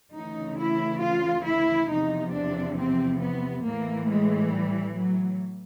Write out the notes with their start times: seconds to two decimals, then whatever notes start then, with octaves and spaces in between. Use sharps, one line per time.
0.15 D2 C#3 E3 D#4
0.59 E4
1.02 F4
1.46 E4
1.90 E2 C3 F3 D#4
2.33 D4
2.77 C4
3.20 B3
3.64 A2 E3 A#3
4.08 G#3
4.52 G3
4.95 F#3